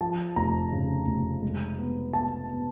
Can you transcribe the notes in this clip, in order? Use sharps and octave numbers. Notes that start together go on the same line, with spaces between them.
F3 A5
F1 A#5
C#3
F1
G#3
B3
B3 A5
B3